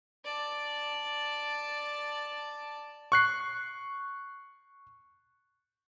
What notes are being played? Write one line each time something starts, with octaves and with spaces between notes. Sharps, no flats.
D5 A5
C#6 F#6 C7